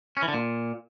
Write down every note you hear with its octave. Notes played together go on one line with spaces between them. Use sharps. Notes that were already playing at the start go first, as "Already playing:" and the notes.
C#4
E3
D3
A#2